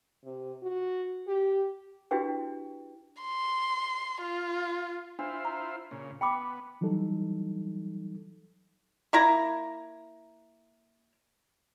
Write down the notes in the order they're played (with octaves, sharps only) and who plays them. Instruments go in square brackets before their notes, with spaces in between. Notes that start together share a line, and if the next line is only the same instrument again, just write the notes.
[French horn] C3
F#4
G4
[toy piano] D4 E4 F#4 G4 B4 G5
[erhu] C6
F4
[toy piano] D4 [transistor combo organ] E4 F4 C5
[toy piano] A#5
[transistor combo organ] A#2 C#3
[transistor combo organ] B3 [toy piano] G5 B5 D6
[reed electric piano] E3 F#3 G3 D#4 A4
[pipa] A#3 E4 A#5